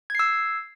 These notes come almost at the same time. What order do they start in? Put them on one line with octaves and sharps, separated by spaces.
G#6 C7 E6